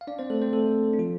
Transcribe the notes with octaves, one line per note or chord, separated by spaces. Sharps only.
F5
D4 D5
C4 C5
A3 A4
C4 C5
A3 A4
D4
F3 F4